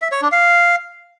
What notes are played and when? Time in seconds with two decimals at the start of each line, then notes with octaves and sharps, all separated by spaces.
0.02 E5
0.12 C#5
0.22 D4
0.32 F5